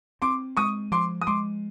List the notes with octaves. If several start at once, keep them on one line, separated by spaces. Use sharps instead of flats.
C4 C6 D6
G#3 C#6 D#6
F3 C6 D6
D#6
G#3 C6 D6